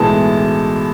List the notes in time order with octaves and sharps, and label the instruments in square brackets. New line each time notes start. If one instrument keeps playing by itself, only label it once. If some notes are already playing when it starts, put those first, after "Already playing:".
Already playing: [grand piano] B1 A2 E3 G#3 A5